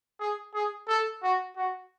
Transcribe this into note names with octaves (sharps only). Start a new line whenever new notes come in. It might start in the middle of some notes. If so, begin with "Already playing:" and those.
G#4
G#4
A4
F#4
F#4